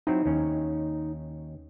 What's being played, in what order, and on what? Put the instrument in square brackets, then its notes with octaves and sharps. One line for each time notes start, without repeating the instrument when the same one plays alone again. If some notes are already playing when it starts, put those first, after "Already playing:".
[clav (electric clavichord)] F#3 C4 E4 [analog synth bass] D#4
[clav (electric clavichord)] D#2 C#4